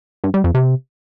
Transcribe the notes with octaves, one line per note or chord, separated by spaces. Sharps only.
G2
G3
F2
C3